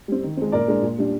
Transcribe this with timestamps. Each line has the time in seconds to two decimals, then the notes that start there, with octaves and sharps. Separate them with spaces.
0.08 G3 C4
0.23 D#3
0.37 G#3 C4
0.52 A#2 A#4 D5
0.68 G#3 D4
0.82 A#2
0.98 G3 D4